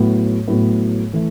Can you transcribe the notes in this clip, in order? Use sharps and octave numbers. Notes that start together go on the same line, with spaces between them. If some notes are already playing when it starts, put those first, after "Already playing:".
Already playing: A2 F#3 B3
A2 F#3 B3
E3 A3